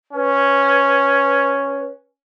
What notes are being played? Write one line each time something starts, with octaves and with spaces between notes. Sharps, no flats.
C#4 B4